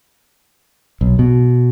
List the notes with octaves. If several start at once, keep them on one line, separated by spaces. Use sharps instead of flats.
B1
B2